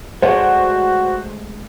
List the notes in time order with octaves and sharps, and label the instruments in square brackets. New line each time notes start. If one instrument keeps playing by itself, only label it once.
[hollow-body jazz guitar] G#3 A3 [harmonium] F#4 [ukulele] B4 D5 F#5 [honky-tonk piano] C5